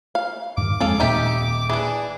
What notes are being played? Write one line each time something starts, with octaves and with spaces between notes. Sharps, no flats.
F5
G2 D#3 D6
F2 G#3 C4 G#4 A4 F5
D#1 A#2 D#4 G4 E5
E3 D4 G#4